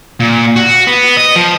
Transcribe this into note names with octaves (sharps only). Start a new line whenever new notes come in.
A#2
F#4
B3
D#5
F3